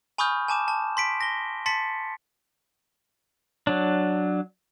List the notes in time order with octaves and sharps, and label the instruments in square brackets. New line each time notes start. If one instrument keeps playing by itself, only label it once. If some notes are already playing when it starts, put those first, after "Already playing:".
[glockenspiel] G#5 B5 C#6 D#6 F6 G6
G#5 A5 D6 E7
A5
C6 B6 D7
A#6 G7
A5 C6 A6 B6 C#7
[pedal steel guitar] F#3 D4